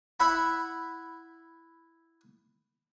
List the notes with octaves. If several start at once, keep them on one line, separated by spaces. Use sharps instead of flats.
E4 E5 F#5 B5